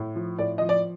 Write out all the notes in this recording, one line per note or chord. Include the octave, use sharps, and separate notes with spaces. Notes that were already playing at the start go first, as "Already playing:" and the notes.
Already playing: A2
F3
A2 D5
F3 D#5
D5